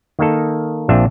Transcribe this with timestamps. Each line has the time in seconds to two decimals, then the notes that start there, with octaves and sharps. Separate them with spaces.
0.19 D#3 A#3 D#4 A4
0.89 A#1 C4 D4 F4 E5